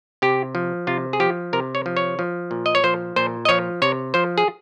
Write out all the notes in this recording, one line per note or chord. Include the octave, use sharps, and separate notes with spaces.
C3 G4
F3
C3 F4
G#4
F3 G4
C3 A#4
C#5
F3
C#5
F3
A#2
D#5
C#5
F3 C5
A#2 C5
D#5
F3 C#5
C3 C#5
F3 C5
G#4